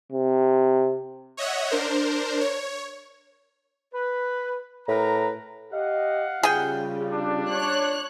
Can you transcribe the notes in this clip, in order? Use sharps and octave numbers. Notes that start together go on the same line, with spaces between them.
C3
C#5 D#5 E5 F#5
D4 A#4 C5
C#5
B4
A2 A#4 B4 A#5
G4 D#5 F5 F#5
C#3 G3 F4 G#4 G5
D4
C#5 F#6